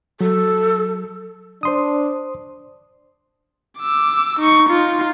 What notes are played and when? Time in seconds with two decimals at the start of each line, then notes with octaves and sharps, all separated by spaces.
0.21 F#3 A4
1.63 D4 C5 C6 D#6
3.80 D6 E6
4.40 D#4 C#6
4.69 D#4 F4